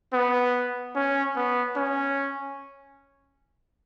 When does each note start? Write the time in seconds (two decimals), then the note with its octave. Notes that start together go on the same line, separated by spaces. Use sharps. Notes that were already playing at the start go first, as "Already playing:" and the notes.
0.13 B3
0.95 C#4
1.36 B3
1.76 C#4